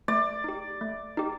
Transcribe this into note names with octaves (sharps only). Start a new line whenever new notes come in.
A3 D5
D#4 G4
A3
D#4 G4